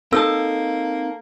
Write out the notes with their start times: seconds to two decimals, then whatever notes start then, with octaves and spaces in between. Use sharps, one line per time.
0.13 A#3 C4 D#4 A4 A5 E6